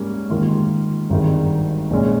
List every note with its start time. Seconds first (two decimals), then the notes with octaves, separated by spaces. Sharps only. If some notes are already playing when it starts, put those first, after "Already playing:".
Already playing: G#2 G3 A#3 C#4
0.30 G#2 D#3 A#3 F4
1.10 G#1 G2 D#3 G#3
1.90 A#1 A#2 G#3 C#4